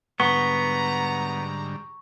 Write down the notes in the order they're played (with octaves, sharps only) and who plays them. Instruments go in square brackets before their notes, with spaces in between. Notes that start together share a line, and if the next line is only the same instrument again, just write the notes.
[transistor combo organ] G#2 D3 G3 [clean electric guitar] B3 [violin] A#5 [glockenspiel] C#6